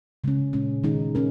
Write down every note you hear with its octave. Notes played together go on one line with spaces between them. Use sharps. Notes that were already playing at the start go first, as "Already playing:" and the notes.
C#3 G#3 C#4
A#2 G#3 C#4
D#3 G#3 D#4 G#4
C#4 A#4